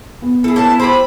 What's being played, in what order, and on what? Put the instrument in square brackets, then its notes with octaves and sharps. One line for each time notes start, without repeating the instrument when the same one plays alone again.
[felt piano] B3
[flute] E4 [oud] G#4 A4
[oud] A#3 C#4 [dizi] A5
[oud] G4 G#4 C5 [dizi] B5